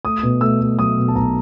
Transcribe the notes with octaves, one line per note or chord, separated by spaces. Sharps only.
A3 D#6
B2
A3 E6
A3
F#3 D#6
B2
A5
B1 A#5